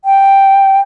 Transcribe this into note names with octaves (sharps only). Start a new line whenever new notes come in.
G5